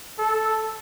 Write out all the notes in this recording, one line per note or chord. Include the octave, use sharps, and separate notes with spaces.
A4